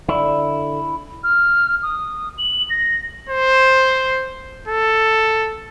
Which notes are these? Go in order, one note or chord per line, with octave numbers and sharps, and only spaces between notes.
D3 E4
F6
D#6
F#7
A#6
C5
A4